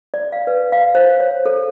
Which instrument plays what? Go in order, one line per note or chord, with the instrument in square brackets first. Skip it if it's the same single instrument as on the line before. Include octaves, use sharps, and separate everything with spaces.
[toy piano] D5
F5
B4
F5
C5
C#5
A4